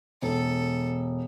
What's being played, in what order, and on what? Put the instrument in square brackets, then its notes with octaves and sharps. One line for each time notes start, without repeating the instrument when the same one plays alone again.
[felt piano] E1 [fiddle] A4